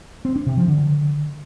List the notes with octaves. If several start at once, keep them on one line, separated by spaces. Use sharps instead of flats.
C4
D4
C3
F3
D3